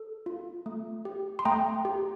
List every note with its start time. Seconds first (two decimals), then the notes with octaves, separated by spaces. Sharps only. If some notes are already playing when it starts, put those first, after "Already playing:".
Already playing: A4
0.26 F4
0.66 A3
1.05 G4
1.39 C6
1.45 A3 G5 A#5
1.85 G4